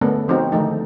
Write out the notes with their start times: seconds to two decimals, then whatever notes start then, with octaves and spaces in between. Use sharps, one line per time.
0.01 D3 A3 B3 C#4 A#4
0.28 F3 C4 D#4 F#4
0.52 D3 D#3 F3 G#3 A3 D#4